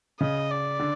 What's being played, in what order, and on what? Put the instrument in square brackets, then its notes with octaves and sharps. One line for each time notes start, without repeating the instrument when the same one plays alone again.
[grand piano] C#3 [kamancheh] D#5
[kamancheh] D5
[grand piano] D3